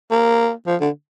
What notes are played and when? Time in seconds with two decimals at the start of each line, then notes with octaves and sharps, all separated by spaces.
0.11 A#3
0.67 F3
0.80 D3